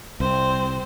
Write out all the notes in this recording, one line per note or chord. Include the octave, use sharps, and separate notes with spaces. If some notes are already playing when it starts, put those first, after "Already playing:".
C2 C4 C5